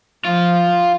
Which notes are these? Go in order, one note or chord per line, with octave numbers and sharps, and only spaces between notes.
F3 F4